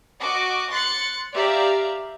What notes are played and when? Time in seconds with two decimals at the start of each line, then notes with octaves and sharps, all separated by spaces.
0.20 F#4 D#5 D6
0.71 C6 F#6 A6 C#7
1.34 G4 D5 E5 F5 A#5